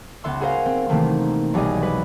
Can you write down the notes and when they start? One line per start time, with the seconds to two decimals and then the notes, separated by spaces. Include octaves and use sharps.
0.24 C#2 B3 E5 C6 E6
0.40 F#4 G#4 A#4 C5 F5
0.66 C4
0.89 C3 D#3 E3 A3 A#3 C4
1.54 B1 G3 G#4 D#5
1.81 G#3 B4